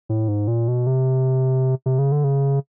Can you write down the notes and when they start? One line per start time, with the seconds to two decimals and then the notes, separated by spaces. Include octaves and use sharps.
0.09 A2
0.28 G#2
0.48 A#2
0.68 B2
0.87 C3
1.86 C3
1.99 C#3
2.12 D3
2.24 C#3